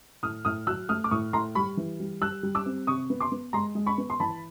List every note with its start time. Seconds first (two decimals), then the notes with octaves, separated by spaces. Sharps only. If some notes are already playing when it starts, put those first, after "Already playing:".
0.23 A2 D#6 F6
0.45 A2 D#6 F6
0.67 F#3 E6 F#6
0.89 A3 D#6 F6
1.04 D6
1.11 A2 C#6 D#6
1.33 A2 A#5 C6
1.55 G3 B5 C#6
1.77 E3
2.00 G3
2.21 G3 E6 F#6
2.43 G3
2.55 D6 E6
2.66 C4
2.87 C3 C#6 D#6
3.10 B3
3.20 C6 D6
3.32 B3
3.53 G#3 A#5 C6
3.75 G#3
3.86 B5 C#6
3.98 B3
4.10 C6
4.20 E3 A5 B5